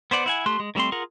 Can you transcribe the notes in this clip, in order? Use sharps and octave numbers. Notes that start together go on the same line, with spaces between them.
B3 C5 D5 F#5
E4 F#5 G#5
A3 G4 C6 F#6
G#3
D#3 G3 A3 C4 C6
F4 G#4 A#4 F#5